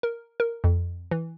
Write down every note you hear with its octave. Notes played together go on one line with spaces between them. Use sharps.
A#4
A#4
F2
E3